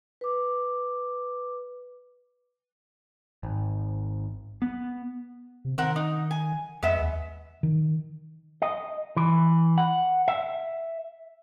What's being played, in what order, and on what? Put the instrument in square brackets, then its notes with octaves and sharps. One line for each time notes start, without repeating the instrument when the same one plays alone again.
[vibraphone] B4 D6
[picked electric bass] G#1
B3
[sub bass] C3
[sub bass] D#3 [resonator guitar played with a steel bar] C4 A#4 F#5
[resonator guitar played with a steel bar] D#4
G#5
[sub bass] F2 [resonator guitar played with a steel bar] G#3 B3 E5
[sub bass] D#2
[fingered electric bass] D#3
[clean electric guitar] D#5
E3
F#5
E5